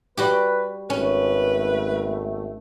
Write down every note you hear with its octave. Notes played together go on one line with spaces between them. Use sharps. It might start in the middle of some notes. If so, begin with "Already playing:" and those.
G3 F#4 G4 B4
G#1 A3 C#4 B4